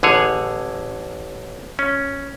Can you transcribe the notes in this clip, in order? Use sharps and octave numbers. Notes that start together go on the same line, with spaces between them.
A1 D3 G#4 C#5
C#4